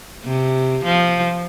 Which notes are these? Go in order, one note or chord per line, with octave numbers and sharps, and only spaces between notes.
C3
F3